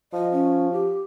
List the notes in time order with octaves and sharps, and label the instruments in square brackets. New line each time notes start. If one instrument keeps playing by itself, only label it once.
[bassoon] F3 [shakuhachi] D#5
[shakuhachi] C#4
G4